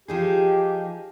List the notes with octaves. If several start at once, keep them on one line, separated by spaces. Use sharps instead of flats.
F3 D#4 G4 G#4